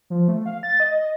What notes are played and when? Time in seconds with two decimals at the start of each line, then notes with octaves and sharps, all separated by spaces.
0.10 F3
0.28 A3
0.46 F5
0.63 A6
0.80 D#5
1.01 D#5